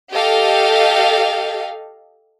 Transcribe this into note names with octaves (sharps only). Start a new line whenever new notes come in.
G4 A4 D#5 F5